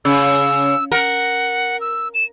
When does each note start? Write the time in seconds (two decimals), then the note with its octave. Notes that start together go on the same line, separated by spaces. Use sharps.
0.05 C#3 E6
0.92 A#4 F#5
1.81 E6
2.14 E7